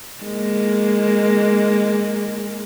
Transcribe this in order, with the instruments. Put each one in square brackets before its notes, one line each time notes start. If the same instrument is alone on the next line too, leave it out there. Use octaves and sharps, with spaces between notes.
[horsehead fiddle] G#3 A#3